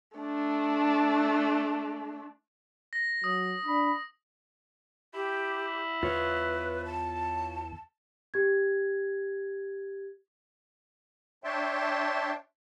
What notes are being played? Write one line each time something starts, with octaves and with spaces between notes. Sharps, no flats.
A3 D4
A#6
F#3 D#6
D4 B5
E4 G4
E2 F4 B4 C#5
A5
G4 G#6
D4 C#5 E5 G5 A5 C6